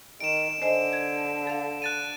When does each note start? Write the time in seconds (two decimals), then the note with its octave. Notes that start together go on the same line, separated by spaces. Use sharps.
0.20 D#3 D7 E7
0.62 D3 C5 D#5 G#5
0.93 G#6
1.47 A4 F5
1.82 F#6 A6 D#7